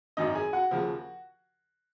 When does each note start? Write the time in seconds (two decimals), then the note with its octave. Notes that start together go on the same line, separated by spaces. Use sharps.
0.17 G#1 F#2 D#3 D#4 D#5
0.35 G#4 G#5
0.53 F#4 F#5
0.71 D#2 C#3 F3